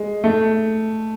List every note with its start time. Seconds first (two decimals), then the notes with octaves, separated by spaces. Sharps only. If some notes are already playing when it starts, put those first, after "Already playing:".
Already playing: G#3
0.24 A3